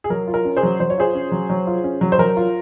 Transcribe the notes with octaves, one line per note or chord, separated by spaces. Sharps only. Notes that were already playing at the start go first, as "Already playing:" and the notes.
G#4
F#3 A#4
F4
A#4
C#4
G#4 C5
F#3
F#3 C5
C#5
F4 G#4 C5
C#4
F#3
F#3
F4
C#4
F#3
C5
F#3 A#4
F4